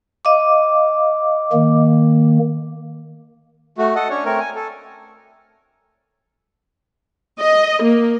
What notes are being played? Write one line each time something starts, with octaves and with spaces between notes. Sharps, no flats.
D#5 F5 D6
D#3 A#3
A3 F#4
A4 D#5 F#5
C#4 D4 C#5
A3 C4 A#4 C#5
G#5
A4
D#5
A#3